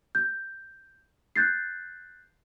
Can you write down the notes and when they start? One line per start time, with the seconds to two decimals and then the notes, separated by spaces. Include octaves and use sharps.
0.15 G6
1.36 F#6 G6 A6 C7